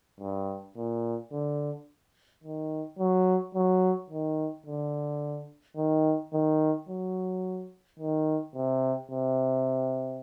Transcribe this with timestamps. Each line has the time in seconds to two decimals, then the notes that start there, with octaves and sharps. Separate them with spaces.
0.20 G2
0.77 A#2
1.32 D3
2.44 D#3
2.99 F#3
3.55 F#3
4.10 D#3
4.66 D3
5.77 D#3
6.33 D#3
6.89 F#3
7.99 D#3
8.56 C3
9.11 C3